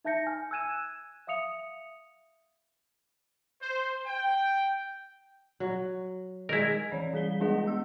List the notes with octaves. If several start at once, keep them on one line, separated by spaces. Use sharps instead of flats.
D#4 E5 A5 G6 A#6 C#7
G#5 F6
E6 F#6 G#6 D#7 E7
E5 F5 D#6 C#7 F7
C5
G5
F#3
D#3 G#3 E4 A#4
E3 C#5 D5
G3 G#4 B6 G7
G#3 B3 D4 G#4 D#5 F#5
B3 E6